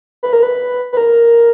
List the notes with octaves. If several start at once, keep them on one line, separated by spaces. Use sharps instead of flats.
B4
A#4
B4
B4
A#4